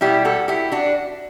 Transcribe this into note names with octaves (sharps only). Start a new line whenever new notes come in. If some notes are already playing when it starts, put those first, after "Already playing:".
B2 G3 B3 E4 G4
F#4 A4
E4 G4
D4 F#4